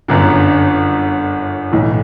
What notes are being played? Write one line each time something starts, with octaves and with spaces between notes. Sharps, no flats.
G1 F#2 D3
B1 A2 E3